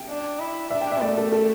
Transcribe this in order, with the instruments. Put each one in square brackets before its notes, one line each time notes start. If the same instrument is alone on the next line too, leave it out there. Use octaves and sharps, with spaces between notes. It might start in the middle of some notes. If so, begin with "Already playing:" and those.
Already playing: [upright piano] G5
[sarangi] D4
E4
[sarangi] D4 [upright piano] E5
[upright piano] G5
E5
[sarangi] A3 [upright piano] D5
[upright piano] A4
A4